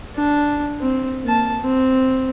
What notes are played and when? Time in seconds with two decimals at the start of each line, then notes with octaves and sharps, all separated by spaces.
0.15 D4
0.80 C4
1.23 A#3 A5
1.61 C4